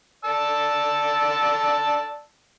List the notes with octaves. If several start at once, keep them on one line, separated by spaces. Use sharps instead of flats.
D5 A5 E6